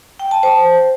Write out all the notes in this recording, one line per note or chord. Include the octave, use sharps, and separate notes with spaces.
G5
A5
C5